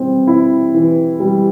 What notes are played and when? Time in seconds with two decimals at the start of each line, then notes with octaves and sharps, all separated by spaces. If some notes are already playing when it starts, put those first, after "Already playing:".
Already playing: E3 G3 C4
0.27 E4
0.74 E3
1.20 G3